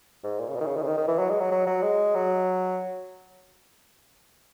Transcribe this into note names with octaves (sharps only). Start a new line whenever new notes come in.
G#2
A#2
C#3
B2
D#3
C#3
D#3
C#3
D#3
D#3
E3
F#3
G#3
F#3
F#3
F#3
G#3
F#3